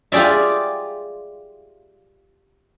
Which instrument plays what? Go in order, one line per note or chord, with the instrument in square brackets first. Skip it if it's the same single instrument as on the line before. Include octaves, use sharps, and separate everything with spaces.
[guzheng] F4 G4 G#4 D5 E5